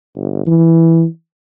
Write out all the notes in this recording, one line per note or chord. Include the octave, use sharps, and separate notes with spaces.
G1
E3